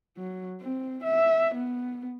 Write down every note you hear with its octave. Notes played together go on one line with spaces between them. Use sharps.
F#3
C4
E5
B3